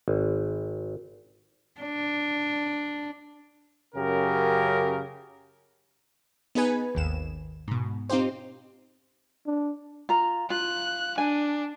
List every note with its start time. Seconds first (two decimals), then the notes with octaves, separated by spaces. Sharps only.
0.08 G#1
1.81 D4
3.95 F#2 C#3 G4 A#4
6.55 B3 D#4 G#4 B4 G#5
6.95 G#1 D#2 E7
7.68 G#2 B2
8.09 C4 D#4 F4 G4 C5
9.46 D4
10.09 F4 A#5
10.50 F4 F#6
11.18 D4 G#5